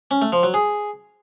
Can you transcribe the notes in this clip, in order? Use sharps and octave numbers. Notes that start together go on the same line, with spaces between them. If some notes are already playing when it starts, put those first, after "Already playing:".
C#4
A3
F3
F#3
G#4